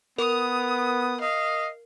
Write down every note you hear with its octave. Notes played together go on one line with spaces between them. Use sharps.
B3 A#4 D#6
D#5 F5